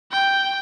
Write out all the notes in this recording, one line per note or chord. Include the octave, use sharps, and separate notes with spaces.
G5